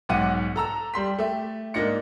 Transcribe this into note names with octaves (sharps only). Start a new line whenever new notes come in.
B1 G#2 F#5 D6 F#6 D#7
A4 A#5 E6
G3 C6 B6
A3 G4 E5
G#2 A#3 D4 D#4 A#6 C#7